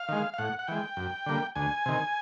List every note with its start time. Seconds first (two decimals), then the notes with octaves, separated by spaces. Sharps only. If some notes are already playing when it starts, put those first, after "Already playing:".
Already playing: F5
0.09 D#3 G#3
0.34 F5
0.38 A2 F#5
0.59 F#5
0.67 E3 G#3 G5
0.97 F#2
1.26 D3 G3 A#3
1.55 D2 G#5
1.86 C3 D#3